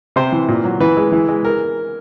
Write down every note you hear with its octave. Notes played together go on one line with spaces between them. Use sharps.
C3 C5
E3
A#2
F#3
E3 B4
G#3
E3
G#3
A#4